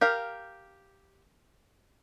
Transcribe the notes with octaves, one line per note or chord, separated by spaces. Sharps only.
G4 A#4 F5